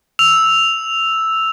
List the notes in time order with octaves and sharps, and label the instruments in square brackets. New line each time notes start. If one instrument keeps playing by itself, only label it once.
[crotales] E6 F7